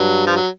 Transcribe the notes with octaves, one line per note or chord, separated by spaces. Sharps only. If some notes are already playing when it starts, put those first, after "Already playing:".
Already playing: G2 F#3
F3
F#3